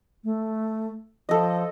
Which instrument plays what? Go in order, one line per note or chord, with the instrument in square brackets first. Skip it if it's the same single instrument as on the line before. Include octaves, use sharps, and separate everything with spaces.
[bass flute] A3
[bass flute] F3 [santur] A4 D#5